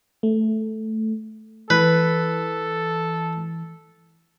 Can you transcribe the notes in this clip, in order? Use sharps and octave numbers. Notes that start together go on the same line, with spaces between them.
A3
E3 A4 B4